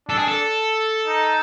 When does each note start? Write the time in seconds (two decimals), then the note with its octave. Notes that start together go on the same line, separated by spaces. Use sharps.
0.09 D4 A4
0.18 G#4
0.28 A4
1.07 D#4